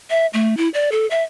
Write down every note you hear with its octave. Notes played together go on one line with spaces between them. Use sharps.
E5
A3
E4
D5
A4
E5